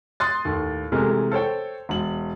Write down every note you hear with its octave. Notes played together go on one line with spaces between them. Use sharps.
C6 D#6 F#6 A6
D#2 A2
C3 E3 G#3 A3 G4 A#4
A4 C5 C#5 G5
E1 F#7